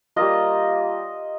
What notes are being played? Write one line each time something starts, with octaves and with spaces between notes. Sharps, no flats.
G3 A#3 F4 D#5